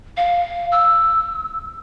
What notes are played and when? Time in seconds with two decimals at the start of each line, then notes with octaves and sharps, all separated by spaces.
0.17 F5
0.72 E6